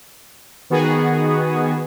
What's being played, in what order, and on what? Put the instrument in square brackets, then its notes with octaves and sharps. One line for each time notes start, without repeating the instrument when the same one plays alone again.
[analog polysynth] D#3 B3 F#4 G#4